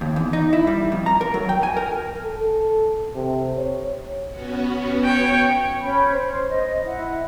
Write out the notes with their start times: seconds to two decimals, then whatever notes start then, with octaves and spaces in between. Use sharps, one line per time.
0.01 D#2
0.16 E2
0.33 D#4
0.53 E4
0.67 G3
0.92 F2
1.06 A#5
1.21 A#4
1.34 F#3
1.49 G5
1.63 G#5
1.77 A#4
2.24 A4
3.15 C3
3.57 C#5
4.29 B3 C#4 F#4
5.04 C#5 G5
5.81 C#4 B5 G6
6.11 C5
6.49 D#5
6.84 E4 F#5